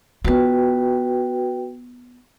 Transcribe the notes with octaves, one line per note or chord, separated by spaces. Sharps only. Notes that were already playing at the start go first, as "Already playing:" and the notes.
B3 F4 F#4 B4 G5